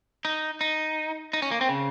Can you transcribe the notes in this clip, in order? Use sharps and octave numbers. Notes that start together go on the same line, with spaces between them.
D#4
D#4
D#4
C#4
A#3
C4
C#3